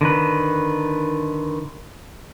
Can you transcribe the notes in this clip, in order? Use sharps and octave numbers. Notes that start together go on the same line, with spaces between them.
D3 D#3 B4